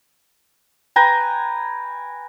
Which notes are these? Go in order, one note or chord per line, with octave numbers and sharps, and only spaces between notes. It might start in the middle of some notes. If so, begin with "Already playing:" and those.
B4 G5 G#5 A#5